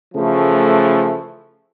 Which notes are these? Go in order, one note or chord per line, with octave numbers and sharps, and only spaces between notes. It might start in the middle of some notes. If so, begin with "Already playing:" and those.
C#3 E3 F3 A3